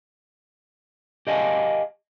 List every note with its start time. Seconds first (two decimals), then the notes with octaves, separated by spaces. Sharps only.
1.27 G4 D#5 F5 G#5 A5